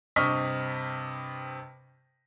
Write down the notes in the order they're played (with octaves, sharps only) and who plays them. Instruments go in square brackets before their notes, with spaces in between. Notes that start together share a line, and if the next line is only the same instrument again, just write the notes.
[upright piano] G2 C3 D#5 C#6 F6 B6